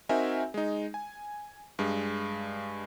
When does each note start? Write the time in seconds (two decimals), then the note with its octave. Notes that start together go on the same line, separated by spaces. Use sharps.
0.09 C4 D#4 F#4 A#4 E5 G#5
0.54 G#3 D#4
0.94 G#5
1.79 G2 G#3